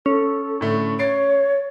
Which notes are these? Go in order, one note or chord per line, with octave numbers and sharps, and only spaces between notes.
C#4 A4
A2 D3 A3
C#5 A6 C7 D7